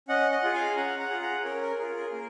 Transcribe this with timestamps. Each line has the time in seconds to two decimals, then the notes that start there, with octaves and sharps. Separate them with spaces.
0.08 C#4 D#5 F#5
0.31 D#5 F#5
0.43 F4 G#4
0.54 F5 G#5
0.76 C#4 F#5 A#5
0.99 F#5 A#5
1.10 F4 G#4
1.22 F#5 A#5
1.44 C#4 A#4 C#5
1.61 A#4
1.79 F4 G#4 A#4
1.95 A#4
2.12 A#3 A#4